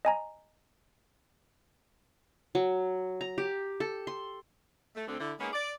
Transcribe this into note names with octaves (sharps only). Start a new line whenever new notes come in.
D#5 G#5 A#5
F#3
A#5
G4
A4
C6
A3
D2 D3 C4
D3 E4
G#3 A#3 B3 C#4 D#4 G#4
D5